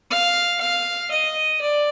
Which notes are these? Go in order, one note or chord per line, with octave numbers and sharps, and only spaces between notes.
F5
F5
D#5
D5